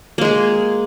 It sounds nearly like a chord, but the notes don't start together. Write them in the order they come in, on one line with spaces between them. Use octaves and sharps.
A#3 G#3 G#4